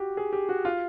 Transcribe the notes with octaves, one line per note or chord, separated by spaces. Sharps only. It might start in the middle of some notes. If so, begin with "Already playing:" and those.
Already playing: F#4 G4
G#4
G4
F#4
F4